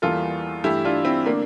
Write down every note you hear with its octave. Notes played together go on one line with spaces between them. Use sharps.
E2 E3 G3 A#3 F4 A4
G2 E3 A3 E4 G4
D4 F4
C4 E4
D3 A3 A#3 D4